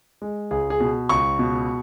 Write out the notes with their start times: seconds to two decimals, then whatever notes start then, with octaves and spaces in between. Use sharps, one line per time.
0.22 G#3
0.51 C#2 G#4
0.70 G#4
0.80 B2
1.09 C#2 C#6
1.39 B2